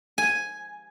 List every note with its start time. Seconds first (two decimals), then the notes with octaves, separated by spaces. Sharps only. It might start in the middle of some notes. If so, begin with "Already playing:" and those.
0.18 G#5